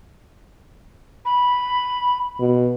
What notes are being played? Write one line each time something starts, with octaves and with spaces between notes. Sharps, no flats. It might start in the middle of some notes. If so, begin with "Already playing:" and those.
B5
B2